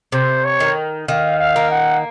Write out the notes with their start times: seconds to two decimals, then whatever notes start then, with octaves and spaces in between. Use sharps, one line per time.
0.12 C3 C5
0.44 C#5
0.60 D#3
1.08 D#3 F5
1.39 F5
1.56 A#3
1.71 F#5